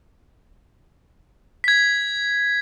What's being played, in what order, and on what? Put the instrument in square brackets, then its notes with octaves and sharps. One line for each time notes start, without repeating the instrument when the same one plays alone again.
[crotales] G#6 B6